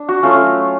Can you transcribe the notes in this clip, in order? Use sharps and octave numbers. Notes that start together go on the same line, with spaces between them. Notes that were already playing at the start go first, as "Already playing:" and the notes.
Already playing: D4
F#4
F#3 A3 C#4 F4